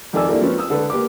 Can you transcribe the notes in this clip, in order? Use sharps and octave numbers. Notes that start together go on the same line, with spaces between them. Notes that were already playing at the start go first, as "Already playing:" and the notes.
F2 D#3 A4 D5 G#5 E6
A#3 D4 E4 G4 A4 A#4
F3 C4 C#4 B4
D#6 E6
D3 A4 B4
A#3 G4 B4 D6